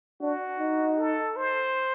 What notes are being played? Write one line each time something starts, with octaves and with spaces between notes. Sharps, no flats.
D4 F#4
D#4
A4
C5